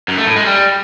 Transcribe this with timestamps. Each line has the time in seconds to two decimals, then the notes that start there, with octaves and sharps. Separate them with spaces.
0.08 F#2
0.17 A3
0.27 A2
0.36 G#3
0.45 G3